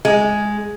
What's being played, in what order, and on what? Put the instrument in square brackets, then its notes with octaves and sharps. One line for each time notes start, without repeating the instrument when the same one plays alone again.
[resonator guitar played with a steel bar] G#3